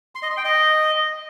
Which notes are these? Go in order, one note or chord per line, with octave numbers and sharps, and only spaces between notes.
C6
D#5
C6
G5
D#5